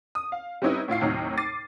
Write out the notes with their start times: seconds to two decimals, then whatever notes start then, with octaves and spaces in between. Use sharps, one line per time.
0.15 D#6
0.32 F5
0.62 G3 C4 C#4 D#4 E4 B4
0.88 A2 E4 F4 C7
1.01 D#2 A2 C3 F#3 D#4 F6
1.37 D6 A6 C7 D#7